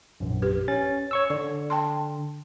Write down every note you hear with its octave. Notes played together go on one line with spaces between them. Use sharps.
A#1 F#2
G4 B4
C#4 A6
C#5 C#6 E6
D3 D5
G5 A5 C6